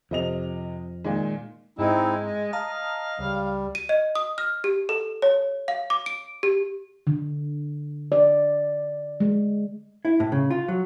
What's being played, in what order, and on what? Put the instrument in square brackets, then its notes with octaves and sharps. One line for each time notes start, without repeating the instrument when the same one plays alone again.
[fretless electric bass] F2 [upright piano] C3 D#5 F7
[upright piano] A#2 D#3 G#3
[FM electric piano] G#2 [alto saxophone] G#3 [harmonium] C4 D#4 E4
[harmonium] D#5
[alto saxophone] F5 [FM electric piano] A5 A#5 D#6
[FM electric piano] C#2 [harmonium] G3
[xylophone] D#7
D#5
D#6
F6
G4
A4
C#5
F5
D6
D7
G4
[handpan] D3
D5
G#3
[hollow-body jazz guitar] E4
A2
C#3
F4
F#3